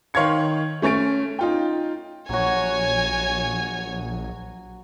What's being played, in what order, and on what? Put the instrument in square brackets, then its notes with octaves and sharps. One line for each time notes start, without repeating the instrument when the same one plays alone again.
[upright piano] D#3 C#5 F5 C6 G#6 C#7
A3 C#4 C#5 A6 D7
D#4 F4 G5
[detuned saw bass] A#1 [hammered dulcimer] F#3 F#4 [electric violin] C#5 G#5